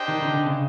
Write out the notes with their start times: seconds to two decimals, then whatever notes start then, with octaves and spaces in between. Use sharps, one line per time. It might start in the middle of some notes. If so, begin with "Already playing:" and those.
Already playing: D4 G4 C5 D#5 G5
0.08 D#3
0.22 D3
0.33 D3
0.46 C#3